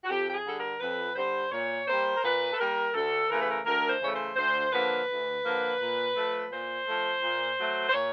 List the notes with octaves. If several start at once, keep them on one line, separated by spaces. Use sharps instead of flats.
F#4
F2 G4
G4
G#4
D3 G3 A4
A#4
F2 B4
D3 G3 C5
A#2 C#5
G3 A#3 C5
A#4
A#2 B4
A4
G3 A#3 A#4
D2 A4
C#3 E3 A3 A#4
B4
A#4
D2 A#4
C5
C#3 E3 A3 C#5
C5
D2 C5
D3 F3 A#3 B4
D2
D3 F3 A#3
A#2
F3 A3
A#2 C5
F3 A3
A#2
F#3 A3
C5
A#2 C#5